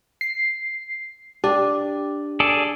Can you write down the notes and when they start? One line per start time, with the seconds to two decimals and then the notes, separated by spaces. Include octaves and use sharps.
0.21 C7
1.44 D4 G4
2.40 G#4 A4 D5